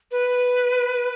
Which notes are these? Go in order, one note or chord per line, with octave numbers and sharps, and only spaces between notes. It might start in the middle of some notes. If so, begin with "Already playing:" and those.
B4